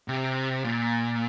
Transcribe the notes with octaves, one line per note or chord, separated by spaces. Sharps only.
C3
A#2